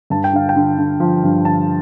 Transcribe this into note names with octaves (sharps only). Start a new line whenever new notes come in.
G2 A5
G5
D3 F5
G5
D3
D3
F3
G2
D3 A5